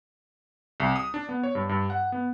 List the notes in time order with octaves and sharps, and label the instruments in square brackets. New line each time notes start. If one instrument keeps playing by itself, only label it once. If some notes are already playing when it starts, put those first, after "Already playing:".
[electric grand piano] C2
D#6
D4
B3
C#5
G2
G2
F#5
B3